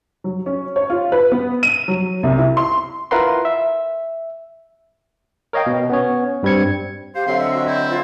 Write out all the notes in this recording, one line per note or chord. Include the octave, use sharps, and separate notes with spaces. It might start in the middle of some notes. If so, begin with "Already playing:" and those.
F#3
C#4
C#5
F4
B4
B3
D#7
F#3
C2
E4
C6
E4 F4 A#4 B4 F#5 C6
E5
A#4 C#5 D#5 F5 G5
B2
B3 C#4 C#5
G2 G3 C4 G#6 C#7
G4 C5 F5
D3 F#3 C4 E5 F5 C6
D#5 E5 F#5
F#4
E4 C5
F4